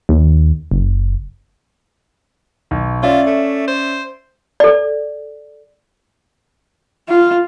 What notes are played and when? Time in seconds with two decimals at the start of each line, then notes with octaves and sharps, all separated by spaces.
0.09 D#2
0.71 F#1
2.71 B1
3.03 C#4 F4 D5 E5
3.26 A3
3.67 C5
4.60 A4 D5
7.09 F4